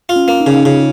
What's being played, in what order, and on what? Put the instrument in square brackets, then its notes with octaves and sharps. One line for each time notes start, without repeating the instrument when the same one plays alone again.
[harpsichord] F4
[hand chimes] C#4
[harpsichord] A#3
[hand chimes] D#4
[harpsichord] C#3 [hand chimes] C#4
[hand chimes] D#4
[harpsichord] C#3 [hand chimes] F4
[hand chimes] G#4